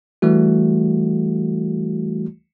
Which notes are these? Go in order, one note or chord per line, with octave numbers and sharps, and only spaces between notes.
E3 G3 A3 F#4